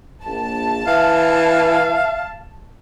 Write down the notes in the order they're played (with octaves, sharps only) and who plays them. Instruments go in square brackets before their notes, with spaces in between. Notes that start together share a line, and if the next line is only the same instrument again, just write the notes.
[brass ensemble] A#1 [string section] A5
[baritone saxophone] E3 [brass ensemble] E5 [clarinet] F5